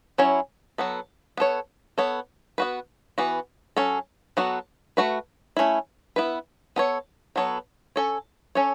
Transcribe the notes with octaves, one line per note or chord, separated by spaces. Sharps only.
F#3 C#4 E4 C#5
F#3 B3 A4
B3 A4 C#5
B3 A4 C#5
B3 F#4 B4
E3 B3 F#4
F#3 C#4 A4
F#3 B3 F#4 A4
A3 F#4 B4
A3 C#4 E4
B3 E4 B4
B3 A4 C#5
F#3 B3 A4 C#5
C#4 A4 C#5
C#4 A4 C#5